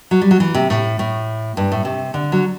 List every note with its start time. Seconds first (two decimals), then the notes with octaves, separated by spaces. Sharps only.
0.11 F#3
0.21 G3
0.31 F#3
0.40 E3
0.54 C3
0.70 A2
0.99 A2
1.57 G2
1.72 A2
1.85 C3
2.14 D3
2.32 F#3